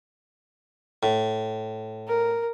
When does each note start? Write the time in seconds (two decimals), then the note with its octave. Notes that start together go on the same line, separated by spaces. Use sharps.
1.03 A2
2.08 A#4